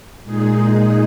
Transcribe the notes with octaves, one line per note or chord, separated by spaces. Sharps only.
A#2 G#3 D#4 G#4